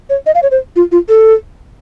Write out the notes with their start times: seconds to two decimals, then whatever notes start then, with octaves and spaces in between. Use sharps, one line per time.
0.10 C#5
0.26 D#5
0.35 F5
0.43 C#5
0.51 C5
0.76 F4
0.92 F4
1.09 A4